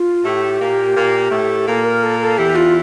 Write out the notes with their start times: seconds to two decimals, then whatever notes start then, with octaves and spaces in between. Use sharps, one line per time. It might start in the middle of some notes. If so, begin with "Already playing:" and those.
Already playing: F4
0.24 A2 A3 G4
0.60 A#2 A#3
0.96 A#2 A#3
1.31 A2 A3
1.67 A#2 A#3 A4
1.84 A#4
2.03 A4
2.21 A4
2.38 E2 E3 G4
2.55 F4